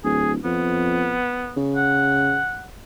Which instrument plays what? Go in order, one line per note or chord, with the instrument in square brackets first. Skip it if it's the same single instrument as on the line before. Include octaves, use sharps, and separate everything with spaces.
[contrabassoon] D1 [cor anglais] G#4
[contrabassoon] F2 [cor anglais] B3
[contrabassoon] C#3
[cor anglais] F#5